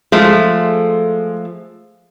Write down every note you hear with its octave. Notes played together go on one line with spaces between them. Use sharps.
F3 G#3 A3